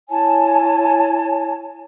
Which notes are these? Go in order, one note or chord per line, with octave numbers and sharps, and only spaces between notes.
E4 C#5 G#5 A5